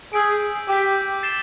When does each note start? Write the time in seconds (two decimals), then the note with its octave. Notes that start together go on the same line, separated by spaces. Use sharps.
0.13 G#4 E6 G6 B6 D7
0.68 G4 D6 G6 B6
1.23 A6 C7 E7 G7